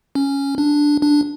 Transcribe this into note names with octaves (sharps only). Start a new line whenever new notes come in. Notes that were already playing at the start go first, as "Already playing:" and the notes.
C#4
D4
D4